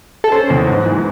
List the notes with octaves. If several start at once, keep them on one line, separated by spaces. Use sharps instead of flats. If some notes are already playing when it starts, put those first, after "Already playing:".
A4
C#4 C5
E2
G#2
E3